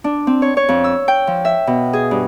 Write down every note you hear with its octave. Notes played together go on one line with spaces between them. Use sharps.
D4
C4
C#5
C#5
F2
E6
G5
F3
E5
B2
G#4
G2